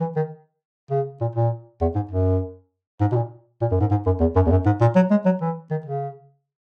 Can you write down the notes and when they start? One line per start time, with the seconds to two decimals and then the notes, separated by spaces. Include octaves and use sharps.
0.01 E3
0.16 D#3
0.91 C#3
1.21 A#2
1.35 A#2
1.81 E2
1.95 G#2
2.11 F#2
3.01 G#2
3.12 B2
3.16 A#2
3.62 A#2
3.72 F#2
3.81 G#2
3.91 G#2
4.06 F#2
4.21 E2
4.36 F#2
4.47 E2
4.51 F#2
4.66 G#2
4.81 A#2
4.96 F#3
5.11 G#3
5.26 F#3
5.41 E3
5.71 D#3
5.86 C#3